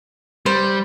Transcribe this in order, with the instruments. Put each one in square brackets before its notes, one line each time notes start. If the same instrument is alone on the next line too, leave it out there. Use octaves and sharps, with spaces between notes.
[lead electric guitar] G3 [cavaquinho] C5